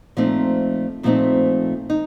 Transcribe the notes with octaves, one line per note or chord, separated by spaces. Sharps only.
A#2 F3 A3 C4 D#4
A#2 F3 A3 C4 D#4
D#4